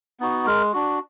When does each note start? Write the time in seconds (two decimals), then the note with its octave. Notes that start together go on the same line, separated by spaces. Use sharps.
0.20 B3 D#4 F#4
0.46 G#3 A#4
0.73 D4 F#4